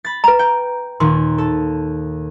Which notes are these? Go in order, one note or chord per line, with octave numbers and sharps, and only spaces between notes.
B5 A6
B4 A#5
G5
D#2 A#2 D#3 C6
A4